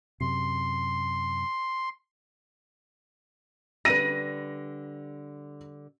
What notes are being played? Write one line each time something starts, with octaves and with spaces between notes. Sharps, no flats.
F#2 C3 C6
D3 G3 B4 A#6 D#7